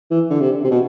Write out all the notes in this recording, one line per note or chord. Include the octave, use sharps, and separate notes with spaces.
E3
D3
C3
C3
B2